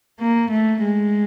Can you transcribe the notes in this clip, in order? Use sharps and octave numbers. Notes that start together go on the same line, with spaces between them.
A#3
A3
G#3